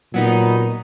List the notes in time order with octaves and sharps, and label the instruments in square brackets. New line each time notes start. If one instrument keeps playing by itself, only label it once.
[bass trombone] A#2 [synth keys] F#3 B3 D#4